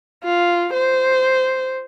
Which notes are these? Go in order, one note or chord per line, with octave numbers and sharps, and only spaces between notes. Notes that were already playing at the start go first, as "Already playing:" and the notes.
F4
C5